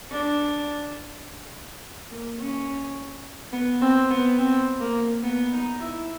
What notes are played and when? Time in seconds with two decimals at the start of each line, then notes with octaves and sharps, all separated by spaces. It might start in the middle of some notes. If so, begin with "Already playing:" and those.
0.12 D4
2.11 A#3
2.39 C#4
3.53 B3
3.82 C4
4.10 B3
4.39 C4
4.80 A#3
5.24 B3
5.53 D#4
5.80 E4